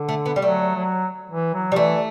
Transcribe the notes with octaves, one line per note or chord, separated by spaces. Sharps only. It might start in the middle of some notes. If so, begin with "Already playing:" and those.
Already playing: D3
A3
B3
G3
F#3 A3
F#3
E3
F#3
G3
E3 A3